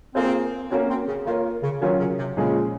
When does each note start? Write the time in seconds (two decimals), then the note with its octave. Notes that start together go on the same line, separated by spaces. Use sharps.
0.15 A#3 C4 F4 G#4 C5
0.70 A#3 C4 C#4 F#4 C#5
0.90 C4
1.08 C#3
1.26 D#3 A#3 F4 A#4 C#5
1.63 C#3
1.82 D#3 F#3 C#4 F4 A#4 C#5
2.00 C#3
2.18 C3
2.37 A#2 C#3 F3 G#3 C#4 G#4